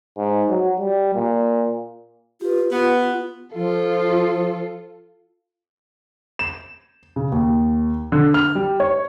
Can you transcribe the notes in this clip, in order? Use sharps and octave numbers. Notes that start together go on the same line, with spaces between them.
G#2
F#3
G3
A#2
F4 G4 B4
B3 F4
F3 F4 A4
E7
C#3
D#2
D3
F6
G3
C#5